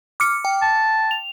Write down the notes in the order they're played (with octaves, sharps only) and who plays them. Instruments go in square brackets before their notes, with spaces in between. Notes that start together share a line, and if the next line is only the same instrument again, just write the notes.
[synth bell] D6 F6 C#7
G5
[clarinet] A5
[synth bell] F7